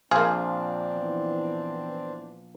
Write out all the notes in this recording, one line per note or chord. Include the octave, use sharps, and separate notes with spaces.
A#1 A#3 C4 D4 G#4 C5 F5
E3 B3